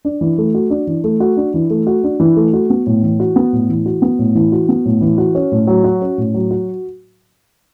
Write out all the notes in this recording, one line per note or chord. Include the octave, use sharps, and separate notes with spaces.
D4
E3
A3
F#4
D4
E3
A3
F#4
D4
E3
A3
F#4
D4
E3
A3
F#4
B3
A2
E3
F#4
B3
A2
E3
F#4
B3
A2
E3
F#4
B3
A2
E3
F#4
C#4
A2
F#3
F#4
C#4
A2
F#3
F#4